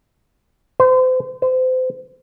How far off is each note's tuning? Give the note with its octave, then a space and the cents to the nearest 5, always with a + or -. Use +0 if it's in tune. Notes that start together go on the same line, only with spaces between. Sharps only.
C5 -35
C5 -30